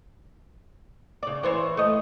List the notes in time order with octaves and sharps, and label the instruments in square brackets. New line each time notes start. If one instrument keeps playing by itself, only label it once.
[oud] C#3 D5
E3 C5 C#5
A3 D#5